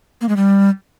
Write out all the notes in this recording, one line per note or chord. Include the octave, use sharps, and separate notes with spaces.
A#3
G#3
G3